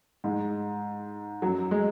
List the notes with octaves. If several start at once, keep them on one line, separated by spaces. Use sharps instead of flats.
G#2 G#3
F#2 F#3
G#3